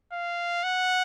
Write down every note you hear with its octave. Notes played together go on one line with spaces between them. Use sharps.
F5
F#5